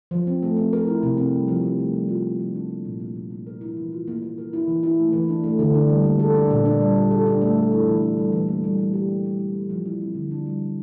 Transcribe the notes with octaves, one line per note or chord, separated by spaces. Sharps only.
F3
C4
A3
C4
A#4
E4
C3
C4
G3
F3
C4
A3
G3
F4
A#3
F3
D4
A#3
A#2
A#3
F3
A#3
A#4
E4
E3
F4
A#3
A#3
A#4
E4
E3
E4
A3
E3
D4
A3
D3
D4
G3
A#3
A4
D4
A#2
D4
G3
G3
A4
D4
A3
A4
E4
E3
D4
G3
E3
A#3
G3
G3
G4
D4
G3
E4
A#3
F3
E4
C4
D3
D4
G3
F3